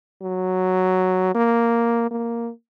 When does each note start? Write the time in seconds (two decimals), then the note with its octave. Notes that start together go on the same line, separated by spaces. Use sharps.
0.22 F#3
1.35 A#3
2.11 A#3